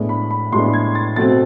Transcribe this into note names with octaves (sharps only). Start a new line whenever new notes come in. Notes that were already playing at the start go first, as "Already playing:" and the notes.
Already playing: A2 G#3 B3 D4
B5
B5
A2 G#3 B3 D4 C6
G#6
A6
B2 A3 C4 A6